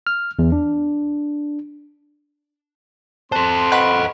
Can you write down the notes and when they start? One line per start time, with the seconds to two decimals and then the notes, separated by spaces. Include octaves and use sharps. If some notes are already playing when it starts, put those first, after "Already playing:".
0.07 F6
0.39 E2
0.52 D4
3.32 C4 A4 C5 A5 C6 F#6
3.72 B4 D#5 F#5 B5 C#6 F#6